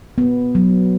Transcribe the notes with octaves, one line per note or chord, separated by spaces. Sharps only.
B3
F#3